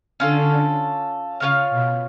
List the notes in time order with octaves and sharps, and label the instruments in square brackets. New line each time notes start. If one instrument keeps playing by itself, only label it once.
[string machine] D3 [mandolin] C#4 F4 A4
[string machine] C#3 [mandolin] F4 A#4 C#5 F5
[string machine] B2